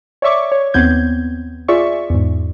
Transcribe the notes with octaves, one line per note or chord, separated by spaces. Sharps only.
C#5 D5 E5 C#6 D6
C#5
D#2 B3 C4 G6 G#6
F4 G#4 D5 E5 C#6
E2 G#2